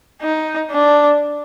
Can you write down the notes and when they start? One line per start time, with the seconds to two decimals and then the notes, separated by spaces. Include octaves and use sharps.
0.22 D#4
0.71 D4